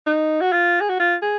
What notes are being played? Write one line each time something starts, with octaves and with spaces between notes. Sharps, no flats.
D#4
F#4
F4
G#4
F#4
F4
G#4